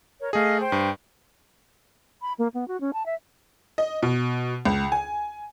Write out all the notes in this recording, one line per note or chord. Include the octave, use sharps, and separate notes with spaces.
A#4 C#5
A3 G#4 D#5 F5
C5 G5
G2
B5
A#3
B3
F#4
C#4
A5
E5
D#5
B2
C#2
G#5